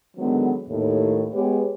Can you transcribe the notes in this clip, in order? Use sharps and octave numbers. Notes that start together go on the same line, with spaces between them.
D3 D#3 F#3 G#3 B3
D#2 A2
G#3 B3 G4 G#4 B4 C#5